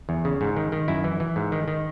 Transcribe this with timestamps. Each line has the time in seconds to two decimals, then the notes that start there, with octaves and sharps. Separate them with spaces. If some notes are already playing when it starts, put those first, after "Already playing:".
0.09 E2
0.25 C#3
0.41 G#2
0.57 D#3
0.72 D#3
0.88 F#2 E4
1.04 E3
1.20 E3
1.36 G#2
1.52 D#3
1.68 D#3